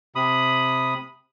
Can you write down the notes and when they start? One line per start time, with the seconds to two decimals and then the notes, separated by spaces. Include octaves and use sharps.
0.15 C3 B5 D#6